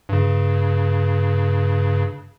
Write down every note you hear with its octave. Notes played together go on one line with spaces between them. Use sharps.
G2 C#3